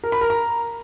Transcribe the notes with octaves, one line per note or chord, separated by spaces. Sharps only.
A#4
B5
A#4
A#5